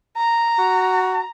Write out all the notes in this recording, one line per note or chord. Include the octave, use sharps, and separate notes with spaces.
A#5
F#4